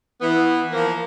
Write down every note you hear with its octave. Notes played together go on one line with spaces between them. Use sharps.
E3 B3
F3 A#3